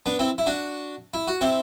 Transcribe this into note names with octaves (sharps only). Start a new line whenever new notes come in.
B3 D4
C4 E4
E4
D4 F#4
E4
F#4
C4 E4